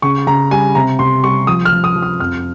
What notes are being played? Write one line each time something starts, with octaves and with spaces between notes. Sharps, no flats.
C#3 C#6
C#3 A#5
G3 G#5
C3 A#5
C3 C6
G3 C#6
F3 D#6
F6
F3
D#6
F3
D#6
F2 F6